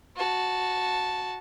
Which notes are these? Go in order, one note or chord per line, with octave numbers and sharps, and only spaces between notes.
F#4 A5